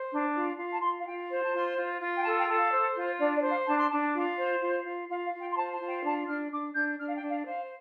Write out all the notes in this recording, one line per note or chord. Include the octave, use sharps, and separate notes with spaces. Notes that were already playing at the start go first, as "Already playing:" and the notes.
Already playing: C5
D4
F4
F4
A5
F4 C6
F5
F4 G5
C5
A5
F4 C6
F4
F4
G5
A4 A5
G5
A4
F5
C5
F4
D4 D5
D5
C5
F5
D4 A5
C6
D4 A5
F4
C5
F4
F4
F4 F5
F5
F4
G5
C6
C5 A5
A5
F4
G5
D4 A5
D4 F6
D4 D6
D4 G6
D4 F6
F5
G5
D4
F5
C5 F5